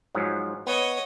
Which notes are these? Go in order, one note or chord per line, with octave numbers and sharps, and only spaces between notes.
G#2 F3 F#3
B3 C#5 D#5